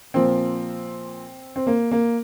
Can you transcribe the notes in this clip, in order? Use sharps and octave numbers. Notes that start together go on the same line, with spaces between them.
A#2 F3 A#3 C4
C4
A#3
A#3